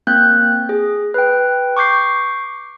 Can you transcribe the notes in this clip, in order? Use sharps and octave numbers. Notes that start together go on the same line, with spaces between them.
A#3 C4 F#6 G6
G#4
B4 G5
C#6 D6 G6 C7